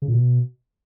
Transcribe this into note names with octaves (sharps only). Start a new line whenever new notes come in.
C#3
A#2
B2